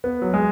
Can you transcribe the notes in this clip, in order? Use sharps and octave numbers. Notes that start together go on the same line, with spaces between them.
B3
F#3
G#3